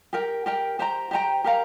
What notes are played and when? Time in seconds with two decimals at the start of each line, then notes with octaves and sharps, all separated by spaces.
0.13 G4 A#4 G5
0.46 G4 A#4 G5
0.79 G4 C5 G5 A#5
1.11 G4 C5 G5 A#5
1.44 G4 A#4 F5 A#5